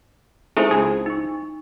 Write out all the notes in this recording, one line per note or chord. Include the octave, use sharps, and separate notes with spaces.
G#3 A3 C4 D#4 E4 C5
C#2 G#4
D#4 C#6